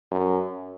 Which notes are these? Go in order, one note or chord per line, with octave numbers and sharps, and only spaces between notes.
F#2